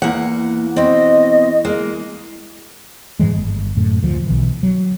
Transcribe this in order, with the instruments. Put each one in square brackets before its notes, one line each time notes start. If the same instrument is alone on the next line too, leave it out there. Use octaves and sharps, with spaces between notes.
[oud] E2 [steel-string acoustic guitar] A#3 F#5
[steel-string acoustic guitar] B2 C4 [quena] D#5
[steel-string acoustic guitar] G#3 A#3
[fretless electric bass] G#2 D#3 E3 G#3
G1
F#2 A2
D2 F3
B1 E3
F#3